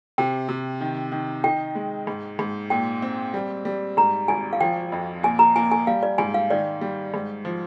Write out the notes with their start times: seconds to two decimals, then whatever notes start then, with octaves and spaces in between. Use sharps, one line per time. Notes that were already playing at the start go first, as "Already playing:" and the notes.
0.18 C3 G5
0.49 C3
0.81 D#3
1.12 D#3
1.43 D#4 G5
1.75 G#3
2.07 G#2
2.39 G#2
2.70 A#2 G5
3.02 C4
3.34 G3
3.65 G3
3.97 G#2 A#5
4.28 G#1 G#5
4.53 F5
4.60 F3 G5
4.92 F2
5.23 A#2 G#5
5.39 A#5
5.56 A#3 G#5
5.71 G#5
5.87 G3 F5
6.03 D5
6.18 G#2 G#5
6.34 F5
6.50 D#3 D5
6.81 G3
7.14 G#2
7.45 F3